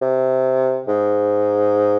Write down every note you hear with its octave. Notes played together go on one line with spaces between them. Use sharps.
C3
G#2